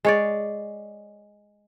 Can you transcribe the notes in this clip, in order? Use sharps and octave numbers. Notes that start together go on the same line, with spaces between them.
G#3 C#5 D5